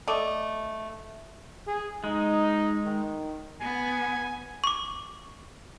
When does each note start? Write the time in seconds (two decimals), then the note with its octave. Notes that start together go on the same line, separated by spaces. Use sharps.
0.08 A3 D5 D#5
1.67 G#4
2.04 G#3 D#4
2.85 D#3
3.61 B3 G#5
4.64 C#6 D6